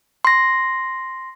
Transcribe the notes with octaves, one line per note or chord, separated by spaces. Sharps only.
C6 A#6